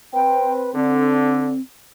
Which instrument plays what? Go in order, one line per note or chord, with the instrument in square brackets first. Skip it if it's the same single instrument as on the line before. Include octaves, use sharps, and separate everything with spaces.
[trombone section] C4 B4 [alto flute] G5
[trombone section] D3 [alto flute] C4